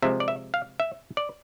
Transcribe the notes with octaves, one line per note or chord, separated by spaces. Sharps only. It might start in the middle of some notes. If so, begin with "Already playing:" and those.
C3 F3 G#3 E5
D5
E5
F5
E5
D5